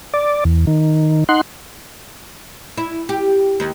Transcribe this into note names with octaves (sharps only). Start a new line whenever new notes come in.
D5
E2
D#3
D#4 F#5 C6
E4
G4
D#2